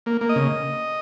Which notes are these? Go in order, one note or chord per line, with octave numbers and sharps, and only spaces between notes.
A#3
A#3
D#5
C#3